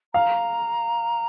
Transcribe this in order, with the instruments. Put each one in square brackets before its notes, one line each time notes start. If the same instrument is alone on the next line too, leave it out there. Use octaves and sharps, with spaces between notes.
[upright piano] F5 [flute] A#5